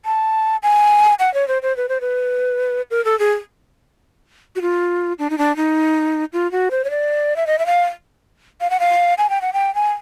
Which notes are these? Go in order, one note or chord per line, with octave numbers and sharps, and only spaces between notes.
A5
G#5
F#5
C#5
C5
C5
B4
C5
B4
A#4
A4
G#4
F#4
F4
D4
D#4
D4
D#4
F4
F#4
C5
C#5
D5
E5
D#5
E5
F5
F5
F#5
F5
G#5
G5
F#5
G5
G#5